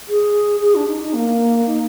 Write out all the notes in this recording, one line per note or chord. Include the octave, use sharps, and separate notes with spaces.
G#4
G#4
D4
D#4
D#4
A#3
D#4